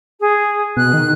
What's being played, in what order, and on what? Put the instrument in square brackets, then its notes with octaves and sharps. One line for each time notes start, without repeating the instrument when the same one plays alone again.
[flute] G#4
[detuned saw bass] B2 [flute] F#6
[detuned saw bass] D#3